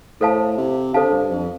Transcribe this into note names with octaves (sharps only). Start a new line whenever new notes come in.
A2 A4 C5 F5 A5
C3
D3 A4 C5 F5 A5
G2
F2